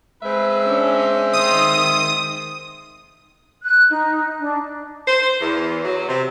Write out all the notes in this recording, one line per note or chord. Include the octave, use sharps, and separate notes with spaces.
G#3 C4 B4 E5
C#4 D4
D#3 C6 D#6
F#6
D#4
D4
C5
E2
F#3
C3